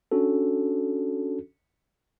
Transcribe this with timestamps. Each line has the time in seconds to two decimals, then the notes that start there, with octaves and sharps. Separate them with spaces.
0.12 C#4 D4 F#4 A4